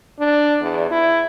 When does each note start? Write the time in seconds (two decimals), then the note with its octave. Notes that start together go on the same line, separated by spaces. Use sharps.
0.19 D4
0.61 E2
0.91 E4